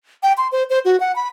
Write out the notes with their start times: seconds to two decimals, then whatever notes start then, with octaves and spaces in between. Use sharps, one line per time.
0.23 G5
0.37 C6
0.52 C5
0.70 C5
0.85 F#4
1.00 F#5
1.16 B5